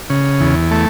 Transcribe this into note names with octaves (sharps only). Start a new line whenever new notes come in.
C#3
E2
A3